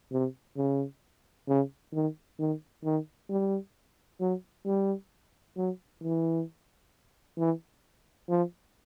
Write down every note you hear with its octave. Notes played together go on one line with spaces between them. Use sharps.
C3
C#3
C#3
D#3
D#3
D#3
G3
F#3
G3
F#3
E3
E3
F3